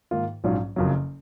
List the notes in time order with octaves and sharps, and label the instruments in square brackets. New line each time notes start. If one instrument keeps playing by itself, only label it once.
[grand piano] G#2 D#3 A#3 F4
A#1 G#2 F#3 C#4 F4
F#1 F2 C#3 F#3